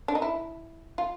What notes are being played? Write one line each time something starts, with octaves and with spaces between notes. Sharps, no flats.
D4
D#4
E4
F4